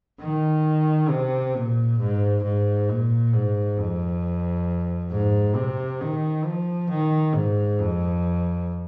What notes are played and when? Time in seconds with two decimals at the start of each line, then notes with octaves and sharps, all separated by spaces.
0.21 D#3
1.11 C3
1.55 A#2
1.99 G#2
2.44 G#2
2.89 A#2
3.33 G#2
3.78 F2
5.11 G#2
5.56 C3
6.01 D#3
6.45 F3
6.90 D#3
7.34 G#2
7.79 F2